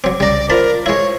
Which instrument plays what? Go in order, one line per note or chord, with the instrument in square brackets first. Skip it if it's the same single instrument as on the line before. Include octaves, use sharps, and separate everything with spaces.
[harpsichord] F#3 C4 [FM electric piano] D6
[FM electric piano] C2 C#3 [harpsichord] G3 A#5 [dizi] D5
[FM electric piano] F4 C5 [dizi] A#4 [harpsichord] A5 B5
[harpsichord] G#3 E4 [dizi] C#5